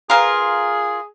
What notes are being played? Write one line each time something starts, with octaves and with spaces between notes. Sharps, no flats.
F4 G#4 A#4 B4 G#5 A#5